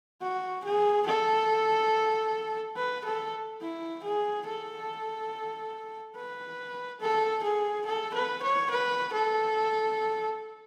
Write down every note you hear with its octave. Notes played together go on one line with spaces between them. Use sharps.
F#4
G#4
A4
B4
A4
E4
G#4
A4
B4
A4
G#4
A4
B4
C#5
B4
A4